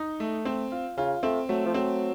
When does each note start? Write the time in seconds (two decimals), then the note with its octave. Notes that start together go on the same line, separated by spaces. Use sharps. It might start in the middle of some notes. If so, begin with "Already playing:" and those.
Already playing: D#4
0.20 A3
0.45 C4
0.72 F4
0.97 C#3 F4
1.23 A3 C4
1.49 F#3 A3
1.66 F3
1.74 F#3 C4